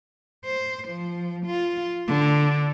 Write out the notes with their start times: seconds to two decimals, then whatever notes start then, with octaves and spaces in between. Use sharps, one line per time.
0.45 C5
0.88 F3
1.46 F4
2.08 D3